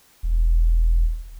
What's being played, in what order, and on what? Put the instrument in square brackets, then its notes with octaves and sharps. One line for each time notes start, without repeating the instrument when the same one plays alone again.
[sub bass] E1